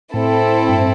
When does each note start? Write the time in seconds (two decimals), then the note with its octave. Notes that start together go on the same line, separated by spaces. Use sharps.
0.14 A2 C4 E4 A4
0.69 G2